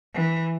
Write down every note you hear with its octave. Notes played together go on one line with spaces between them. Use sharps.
E3